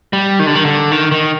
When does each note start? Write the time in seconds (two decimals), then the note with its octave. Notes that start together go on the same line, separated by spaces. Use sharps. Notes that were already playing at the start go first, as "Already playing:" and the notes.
0.13 G3
0.39 D#3
0.47 D3
0.55 D#3
0.65 D3
0.92 D#3
1.11 D#3